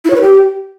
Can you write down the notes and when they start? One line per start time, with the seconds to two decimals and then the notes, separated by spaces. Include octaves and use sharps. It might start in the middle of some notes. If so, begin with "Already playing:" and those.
0.05 E4
0.10 C#5
0.16 B4
0.21 G4